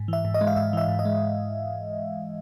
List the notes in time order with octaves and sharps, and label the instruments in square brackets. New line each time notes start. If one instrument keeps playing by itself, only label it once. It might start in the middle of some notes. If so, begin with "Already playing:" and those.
Already playing: [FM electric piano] G#2
E3 E5
G#2
D#5
G#3
F5
G#2 E5
E3 E5
G#2
D#5
G#3